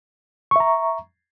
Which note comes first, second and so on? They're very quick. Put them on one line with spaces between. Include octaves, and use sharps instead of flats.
C#6 E5 A#5